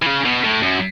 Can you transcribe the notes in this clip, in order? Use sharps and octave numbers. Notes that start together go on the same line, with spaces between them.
E3
C#3
B2
A2
F#2